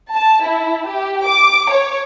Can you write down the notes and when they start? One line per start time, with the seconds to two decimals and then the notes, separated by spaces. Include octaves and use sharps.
0.12 A5
0.44 E4
0.86 G4
1.26 D6
1.71 C#5